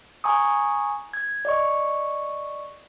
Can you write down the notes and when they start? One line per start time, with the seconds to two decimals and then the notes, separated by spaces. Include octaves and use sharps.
0.24 G#5 A#5 C#6 D#6
1.13 G#6
1.45 D5 D#5 C#6